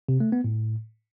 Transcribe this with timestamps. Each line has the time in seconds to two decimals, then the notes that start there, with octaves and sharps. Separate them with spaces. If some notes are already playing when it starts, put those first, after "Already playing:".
0.09 C3
0.20 A3
0.32 B3
0.44 A2